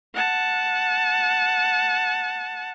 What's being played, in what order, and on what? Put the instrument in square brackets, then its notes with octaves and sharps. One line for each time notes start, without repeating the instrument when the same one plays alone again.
[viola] F#5 A5